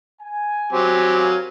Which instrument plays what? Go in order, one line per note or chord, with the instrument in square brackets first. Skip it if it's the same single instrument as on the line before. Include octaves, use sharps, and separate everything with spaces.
[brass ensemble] G#5
[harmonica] F#3 C4 G4
[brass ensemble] A#4 F5 G#5